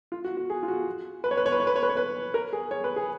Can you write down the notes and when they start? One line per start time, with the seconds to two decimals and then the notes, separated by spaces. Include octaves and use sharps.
0.12 F4
0.24 F#4
0.37 F#4
0.50 G#4
0.63 F4
0.68 F#4
1.24 B4
1.31 C#5
1.37 B4
1.46 C#5
1.52 B4
1.60 C#5
1.67 B4
1.76 C#5
1.83 B4
1.89 C#5
1.97 B4
2.34 A#4
2.53 G#4
2.71 C#5
2.84 B4
2.96 G#4